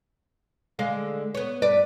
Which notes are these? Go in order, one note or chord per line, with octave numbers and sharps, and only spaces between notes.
D3 G#3 F5
B3 C#5
G2 B4 D5